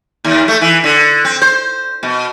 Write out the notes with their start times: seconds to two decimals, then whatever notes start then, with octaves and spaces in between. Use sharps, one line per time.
0.25 D#2
0.48 A3
0.61 E3
0.84 D3
1.25 C4
1.42 C5
2.03 B2